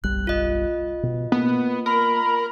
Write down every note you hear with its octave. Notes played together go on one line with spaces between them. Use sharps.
F#1 B1 G3 F#6
F4 D#5
B2
A#3 B3
A#4 B5